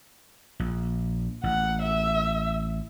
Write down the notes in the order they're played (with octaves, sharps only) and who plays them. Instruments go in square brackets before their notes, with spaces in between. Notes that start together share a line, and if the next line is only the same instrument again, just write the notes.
[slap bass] A#1
[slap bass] A1 [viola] F#5
[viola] E5